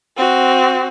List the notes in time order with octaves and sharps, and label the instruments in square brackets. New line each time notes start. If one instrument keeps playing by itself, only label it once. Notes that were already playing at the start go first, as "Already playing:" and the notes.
[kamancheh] C4 F#4